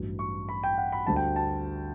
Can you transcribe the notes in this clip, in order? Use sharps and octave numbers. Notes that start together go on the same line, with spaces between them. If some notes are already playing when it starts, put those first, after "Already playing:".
Already playing: A1 G2 F#3
C#6
B5
G5
F#5
B5
D2 D3 G3 A5
G5
A5